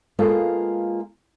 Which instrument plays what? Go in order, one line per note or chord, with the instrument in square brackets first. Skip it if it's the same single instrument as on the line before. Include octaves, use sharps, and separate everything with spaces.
[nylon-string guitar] G#3 A#3 B3 F4 A4